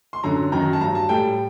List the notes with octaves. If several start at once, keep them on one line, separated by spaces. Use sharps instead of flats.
C6
F#2 D3 F#3 A#5
F#2 D#3 F#3 A#5
A5
G2 F#3 A#5
A5
A2 G3 G5